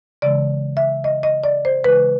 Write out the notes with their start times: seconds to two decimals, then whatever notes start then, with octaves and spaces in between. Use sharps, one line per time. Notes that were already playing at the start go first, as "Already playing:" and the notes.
0.22 C#3 E3 G#3 D5
0.77 E5
1.04 D#5
1.23 D#5
1.44 D5
1.65 C5
1.84 C#3 E3 G#3 B4